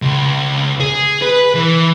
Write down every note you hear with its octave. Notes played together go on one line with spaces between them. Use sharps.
C#2
G#4
B4
E3